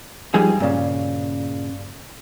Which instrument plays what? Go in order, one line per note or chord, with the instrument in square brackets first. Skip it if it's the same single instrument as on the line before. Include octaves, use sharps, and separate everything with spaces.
[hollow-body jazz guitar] G2 G3 G#4 [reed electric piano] F3 D#4
[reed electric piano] G2 D5 F5 [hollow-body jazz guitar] A#2 C#3